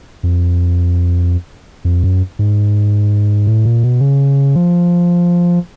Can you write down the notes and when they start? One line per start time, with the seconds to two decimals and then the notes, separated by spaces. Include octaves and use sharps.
0.23 F2
1.85 F2
2.03 F#2
2.39 G#2
3.47 A2
3.65 A#2
3.83 B2
4.00 C#3
4.55 F3